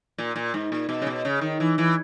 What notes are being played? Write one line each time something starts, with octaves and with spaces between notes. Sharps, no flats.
A#2
A#2
G#2
A#2
B2
C#3
B2
C#3
D#3
E3
E3